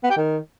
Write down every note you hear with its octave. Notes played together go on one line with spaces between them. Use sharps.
B3
G4
D#3